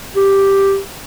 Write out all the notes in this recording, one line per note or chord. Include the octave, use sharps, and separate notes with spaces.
G4